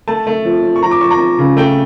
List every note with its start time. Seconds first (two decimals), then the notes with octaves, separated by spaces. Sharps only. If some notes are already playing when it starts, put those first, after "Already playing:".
0.08 A3 A5
0.27 A3
0.45 F3
0.63 F3
0.76 C#6
0.83 F3 A#5
0.91 D6
1.01 F3 C#6
1.11 A#5
1.20 F3
1.38 C#3
1.57 A3 G5